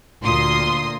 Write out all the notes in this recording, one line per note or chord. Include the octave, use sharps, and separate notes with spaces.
D2 A#2 C6 D#6